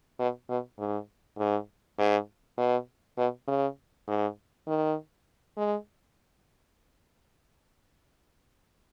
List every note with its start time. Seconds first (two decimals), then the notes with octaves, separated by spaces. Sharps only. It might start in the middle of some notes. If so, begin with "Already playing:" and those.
0.19 B2
0.49 B2
0.79 G#2
1.38 G#2
1.98 G#2
2.57 B2
3.17 B2
3.48 C#3
4.08 G#2
4.67 D#3
5.57 G#3